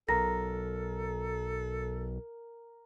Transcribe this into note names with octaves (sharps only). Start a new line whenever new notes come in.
B1 A4 A#4 A#5 A#6